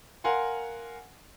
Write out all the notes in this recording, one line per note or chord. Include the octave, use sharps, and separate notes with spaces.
A#4 F5 F#5 G#5 C6